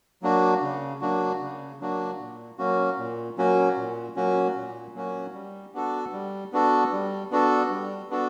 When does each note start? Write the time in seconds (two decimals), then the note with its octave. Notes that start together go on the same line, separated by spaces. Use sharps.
0.22 F#3 A#3 D4 F#4
0.62 C#3
1.01 F#3 A#3 D4 F#4
1.41 C#3
1.80 F#3 A#3 D4 F#4
2.20 A#2
2.58 F#3 A#3 C#4 F#4
2.98 A#2
3.37 F#3 A#3 C#4 F#4
3.77 A#2
4.16 F#3 A#3 C#4 F#4
4.56 A#2
4.95 F#3 A#3 C#4 F#4
5.34 G3
5.74 B3 D4 F#4 A4
6.12 G3
6.52 B3 D4 F#4 A4
6.92 G3
7.31 B3 D4 F#4 A4
7.70 G3
8.10 B3 D4 F#4 A4